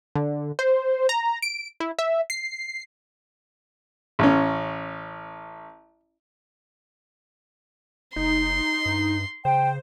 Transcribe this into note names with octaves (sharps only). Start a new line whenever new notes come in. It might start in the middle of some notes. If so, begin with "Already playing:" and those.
D3
C5
A#5
D7
E4
E5
C7
A1 C#4
F#1 D#4 C6
G2
C#3 C5 G5